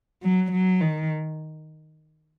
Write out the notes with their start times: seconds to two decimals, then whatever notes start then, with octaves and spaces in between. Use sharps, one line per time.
0.23 F#3
0.52 F#3
0.81 D#3